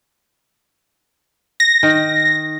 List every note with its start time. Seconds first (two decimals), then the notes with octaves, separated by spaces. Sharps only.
1.60 A#6
1.83 D#3